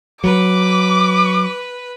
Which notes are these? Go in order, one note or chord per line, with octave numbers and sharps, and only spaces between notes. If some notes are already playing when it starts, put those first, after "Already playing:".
F#3 B4 D6